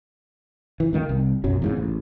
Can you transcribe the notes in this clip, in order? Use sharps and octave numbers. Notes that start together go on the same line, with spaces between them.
E3
C#2 D#3 F#3 A#3
C2
B1 F#2 F#3
E2 G#2 C#3
A1